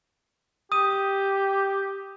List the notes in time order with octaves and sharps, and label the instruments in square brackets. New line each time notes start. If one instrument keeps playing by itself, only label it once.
[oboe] G4 [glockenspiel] D#6 D#7